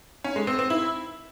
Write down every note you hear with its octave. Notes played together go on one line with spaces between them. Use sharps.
C#4
G#3
C4
C4
E4